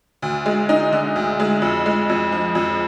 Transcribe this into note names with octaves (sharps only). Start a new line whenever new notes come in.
D2
G#3
D#4
D3
D2
G#3
F2
G#3
F2
F3
F2